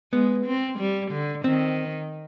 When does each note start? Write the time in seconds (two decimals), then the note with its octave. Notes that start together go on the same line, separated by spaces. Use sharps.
0.12 G#3 B3
0.46 C4
0.79 G3
1.12 D3
1.44 D#3 C4